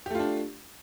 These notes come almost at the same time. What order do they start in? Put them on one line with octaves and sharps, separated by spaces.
G4 A3 F4 D4